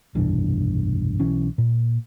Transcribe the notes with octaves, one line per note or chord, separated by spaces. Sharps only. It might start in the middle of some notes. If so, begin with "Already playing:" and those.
F1 B1 G2 E3
B1 E3 C#4
A#2